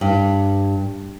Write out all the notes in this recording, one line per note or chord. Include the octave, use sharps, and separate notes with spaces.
G2